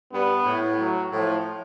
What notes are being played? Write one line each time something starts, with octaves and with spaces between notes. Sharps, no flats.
G2 B3
A2
F#3
A2 F3